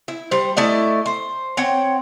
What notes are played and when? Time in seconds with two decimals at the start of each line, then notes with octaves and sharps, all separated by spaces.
0.08 E4
0.31 G3 C5
0.57 A3 E4 D5 D#5
1.06 C5
1.57 C4 C#5 F#5 G5